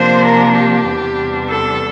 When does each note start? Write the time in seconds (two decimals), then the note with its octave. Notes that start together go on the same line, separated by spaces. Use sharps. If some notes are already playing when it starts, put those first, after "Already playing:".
Already playing: C3 F3 A#3 D4 C5
0.27 A#4
0.57 G4
0.88 E2 C3 E3 G3 D4
1.49 A4